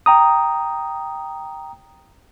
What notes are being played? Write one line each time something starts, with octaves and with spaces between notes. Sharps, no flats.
G5 A#5 D#6